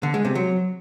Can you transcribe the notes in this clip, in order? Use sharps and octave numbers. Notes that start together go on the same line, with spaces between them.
D3
G#3
C3
F#3